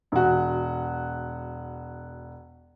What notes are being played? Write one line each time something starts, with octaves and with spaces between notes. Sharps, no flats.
E1 F#4